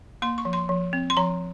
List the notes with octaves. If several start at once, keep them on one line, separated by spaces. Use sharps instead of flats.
A#3 C6
C#6
F3
C6
F3
C4
C6
F3 A#5